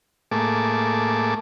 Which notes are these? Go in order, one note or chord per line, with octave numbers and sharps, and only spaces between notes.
A2 A3 A#3 G#4 A5 D6